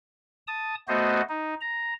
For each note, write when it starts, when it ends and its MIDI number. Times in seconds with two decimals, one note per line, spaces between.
0.47 0.75 81
0.47 0.75 87
0.88 1.21 57
0.88 1.21 59
0.88 1.21 66
0.88 1.21 72
0.88 1.21 75
1.29 1.54 63
1.61 1.93 82